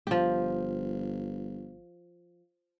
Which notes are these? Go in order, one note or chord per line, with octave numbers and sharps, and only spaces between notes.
G1 F3 G4